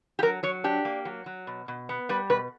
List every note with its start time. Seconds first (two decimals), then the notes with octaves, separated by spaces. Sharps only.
0.19 G4
0.22 F#3 A#4
0.43 F#3 C#5
0.64 D4 G4
0.85 A#3
1.05 F#3
1.26 F#3
1.47 B2
1.68 B2
1.89 B3
2.09 G3 B4
2.30 B2 B4